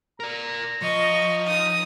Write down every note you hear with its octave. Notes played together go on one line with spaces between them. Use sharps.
A#4 D5 A#5
F3 D#5 C#6
D#4 D#6